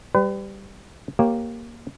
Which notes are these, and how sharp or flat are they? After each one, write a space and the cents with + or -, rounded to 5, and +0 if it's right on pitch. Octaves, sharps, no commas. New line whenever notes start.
G3 +0 B4 +35
A#3 +0 G4 +0 C#5 -20